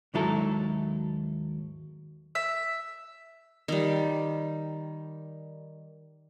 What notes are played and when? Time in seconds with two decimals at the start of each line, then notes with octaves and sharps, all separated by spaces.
0.14 D#2 G#2 F#3 E4 A4 A#5
2.35 E5
3.68 D#3 G3